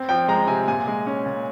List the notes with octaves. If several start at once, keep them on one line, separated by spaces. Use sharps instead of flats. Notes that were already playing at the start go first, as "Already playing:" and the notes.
Already playing: C4
F3 G5
G#3 A#5
C3 G#5
A#2 G#5
G#3
C#4
A#2